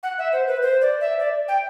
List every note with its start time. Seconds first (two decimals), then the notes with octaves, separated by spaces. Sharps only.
0.03 F#5
0.18 E5
0.33 C5
0.48 B4
0.62 C5
0.82 D5
1.01 E5
1.19 D5
1.48 G5